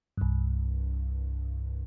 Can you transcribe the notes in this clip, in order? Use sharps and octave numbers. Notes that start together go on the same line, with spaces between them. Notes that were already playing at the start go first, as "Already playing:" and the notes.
C2 G2